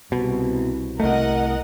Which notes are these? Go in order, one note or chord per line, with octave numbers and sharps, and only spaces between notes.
C2 B2
C2 A3 A#4 D#5 F#5